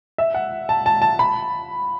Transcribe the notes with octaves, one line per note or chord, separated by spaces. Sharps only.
E5
F#5
A5
A5
A5
B5